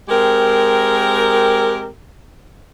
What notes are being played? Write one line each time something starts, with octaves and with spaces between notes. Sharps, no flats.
G#3 C4 G4 A#4